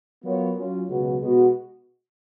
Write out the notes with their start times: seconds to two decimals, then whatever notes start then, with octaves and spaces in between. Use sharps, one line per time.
0.24 F#3 B3 F4 A#4 C#5
0.56 F#3 C#4 F4
0.88 C#2 B2 F#3 B3 F#4
1.21 B2 G#3 B3 F#4